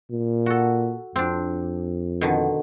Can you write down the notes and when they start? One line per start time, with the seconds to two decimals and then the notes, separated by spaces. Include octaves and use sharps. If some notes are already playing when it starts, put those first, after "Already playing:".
0.11 A#2
0.46 F#4 A4
1.16 F2 C4 D4
2.21 B2 D3 D#3